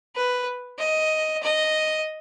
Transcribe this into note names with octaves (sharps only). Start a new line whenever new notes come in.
B4
D#5
D#5